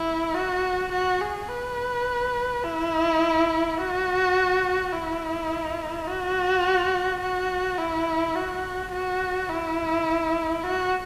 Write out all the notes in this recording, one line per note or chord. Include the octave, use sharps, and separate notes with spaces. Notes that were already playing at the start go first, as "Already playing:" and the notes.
Already playing: E4
F#4
F#4
G#4
B4
E4
F#4
E4
F#4
F#4
E4
F#4
F#4
E4
F#4